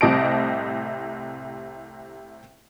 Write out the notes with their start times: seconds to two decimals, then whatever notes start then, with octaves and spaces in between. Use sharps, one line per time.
0.01 C2 A2 C3 D#5 A5 D7